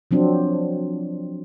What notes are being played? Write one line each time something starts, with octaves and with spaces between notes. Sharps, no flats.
F3 F#3 C4 D4